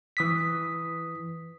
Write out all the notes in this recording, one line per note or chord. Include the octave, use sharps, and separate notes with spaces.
E3 D#6 B6